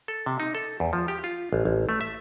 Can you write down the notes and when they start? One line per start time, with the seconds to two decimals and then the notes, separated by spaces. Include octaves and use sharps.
0.08 A4
0.26 C3
0.40 D#4
0.55 A4
0.80 E2
0.93 F3
1.08 G4
1.24 F4
1.53 A1
1.65 A1
1.89 A3
2.01 E5